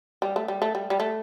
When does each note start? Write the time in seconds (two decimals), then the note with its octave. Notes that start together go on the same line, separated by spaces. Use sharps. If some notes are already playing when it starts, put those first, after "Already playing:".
0.22 G3
0.36 A3
0.48 G3
0.62 A3
0.75 G3
0.90 G3
1.00 A3